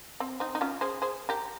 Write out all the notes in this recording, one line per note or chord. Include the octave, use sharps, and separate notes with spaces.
C4
C4 D#4
D#4
C#4 F4
G#4 C5
G#4 C5
G4 A#4